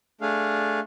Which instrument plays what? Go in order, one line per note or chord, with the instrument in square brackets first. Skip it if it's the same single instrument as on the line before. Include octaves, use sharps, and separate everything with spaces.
[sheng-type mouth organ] A3 D4 G#4 F5